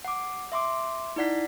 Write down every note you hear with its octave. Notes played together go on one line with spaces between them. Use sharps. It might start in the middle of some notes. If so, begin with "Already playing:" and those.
F#5 D6
E5 C6 D6
D#4 E4 D5 F#5 B6